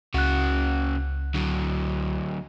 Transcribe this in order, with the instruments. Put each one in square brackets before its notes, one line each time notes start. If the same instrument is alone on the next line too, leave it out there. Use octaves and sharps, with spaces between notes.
[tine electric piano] C#2 F#6 [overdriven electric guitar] C#3 F#4
[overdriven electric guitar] D3 F#3